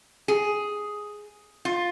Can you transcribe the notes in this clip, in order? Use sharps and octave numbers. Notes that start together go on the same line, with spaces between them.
G#4
F4